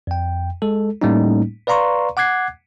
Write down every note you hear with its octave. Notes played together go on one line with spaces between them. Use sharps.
F2 G5
G#3 A4
A2 G3 A3 A#3 C#4 D#4
B4 D5 F5 A#5 C6 C#6
F#5 D6 F#6 G#6 C7